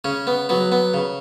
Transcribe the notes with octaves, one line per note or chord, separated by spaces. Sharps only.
C#3 C#4
B3
F#3 B3
B3
C#3